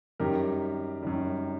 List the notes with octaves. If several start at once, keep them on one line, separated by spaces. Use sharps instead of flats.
F#2 D#3 G3 G4 A#4
F#2 D#3 G3